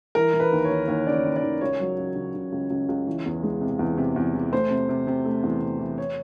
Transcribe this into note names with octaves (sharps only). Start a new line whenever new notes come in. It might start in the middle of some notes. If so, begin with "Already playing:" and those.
E3 A#4
E3
B4
D#2
C#5
D#2
D#2 C#5
C#3 D5
C#5
D#2
D5
D#2
C#2 C#5
F#3
C#2
C#3
C#3
C#2
C#2
C#2
E3
E2
G#3
C3
E2
C3
E2
E3
A3 C5
C3
C3
C3
A3
E2
C3
E3
C#5